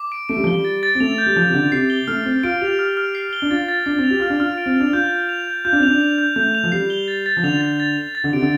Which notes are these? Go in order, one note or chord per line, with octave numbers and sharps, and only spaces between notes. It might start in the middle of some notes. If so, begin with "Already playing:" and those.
Already playing: D6
D7
A3 D7
G3
F3
G3 G7
A6
A6
C4
A3 F7
G6
G3
F3 G6
C3
D3 F7
C3 C7
G7
A3 F6
C4 F6
F4 D7
G4 F7
F6
F6
C7
G7
D4
F4 A6
A6
D4 C7
C4
F7
G4
F4 F6
D4
F4 F6
D7
C4
D4 F7
F4 G6
G6
F7
G6
F4 G6
D4
C4
D4 F7
F7
G6
A3 G6
F7
F3
G3 C7
G7
A6
A6
F3
D3 F7
A6
A6
F7
A6
D3
C3 D7
D3